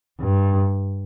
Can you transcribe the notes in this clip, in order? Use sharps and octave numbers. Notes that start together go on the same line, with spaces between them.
G2